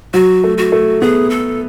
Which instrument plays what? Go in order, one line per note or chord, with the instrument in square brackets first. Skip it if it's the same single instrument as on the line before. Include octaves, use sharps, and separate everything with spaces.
[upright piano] F#3 [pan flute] F#4
[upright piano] A3
[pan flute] F#4
[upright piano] A3
[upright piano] B3 [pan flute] G#4
[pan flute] A4